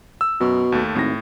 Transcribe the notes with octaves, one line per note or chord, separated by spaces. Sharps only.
E6
F#2 B2
D#2 A3
G#1 A2 A#6